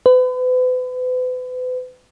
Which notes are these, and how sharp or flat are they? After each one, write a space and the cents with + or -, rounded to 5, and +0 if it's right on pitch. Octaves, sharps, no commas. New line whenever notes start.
B4 +40